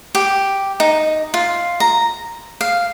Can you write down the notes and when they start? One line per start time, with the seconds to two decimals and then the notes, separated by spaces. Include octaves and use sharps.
0.15 G4
0.80 D#4
1.34 F4
1.80 A#5
2.61 F5